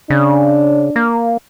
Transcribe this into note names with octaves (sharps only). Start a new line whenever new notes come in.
C#3 D4
A#3